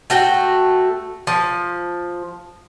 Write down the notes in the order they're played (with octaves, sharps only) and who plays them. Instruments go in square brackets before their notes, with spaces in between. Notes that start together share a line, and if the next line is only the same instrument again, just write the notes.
[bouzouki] A3 F#4 G5
F3